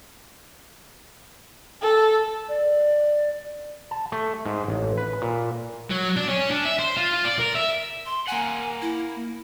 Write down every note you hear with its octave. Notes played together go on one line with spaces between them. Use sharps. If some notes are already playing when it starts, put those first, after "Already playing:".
A4
D5
A5
A3
G#2
A1
B4
A#2
F#3
D4
C#4
D4
E5
C5
F4
F4
D5
A#4
E5
C6
A#3 F#5 G#5
E4